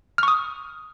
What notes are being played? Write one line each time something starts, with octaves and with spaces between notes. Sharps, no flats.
C#6 D#6 F6